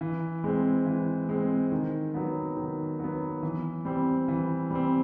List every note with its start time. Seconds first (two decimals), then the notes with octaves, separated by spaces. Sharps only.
0.01 E3
0.44 G#3 C4
0.86 E3
1.29 G#3 C4
1.72 D#3
2.14 F#3 B3
2.57 D#3
2.99 F#3 B3
3.43 E3
3.85 G3 C4
4.28 E3
4.71 G3 C4